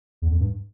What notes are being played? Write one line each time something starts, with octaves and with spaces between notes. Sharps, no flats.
E2
F2
G2